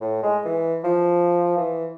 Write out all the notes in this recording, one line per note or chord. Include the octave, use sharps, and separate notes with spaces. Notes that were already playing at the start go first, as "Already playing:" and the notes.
A2
G#3
E3
F3
E3